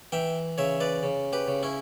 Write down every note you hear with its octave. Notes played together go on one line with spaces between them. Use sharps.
E3 E5 G5
C#3 C#5 E5
B4 D5
C#3
G4 B4
C#3
C#4 E4